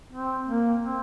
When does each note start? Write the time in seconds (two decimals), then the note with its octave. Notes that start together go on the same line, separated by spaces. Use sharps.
0.12 C4
0.48 A#3
0.84 C4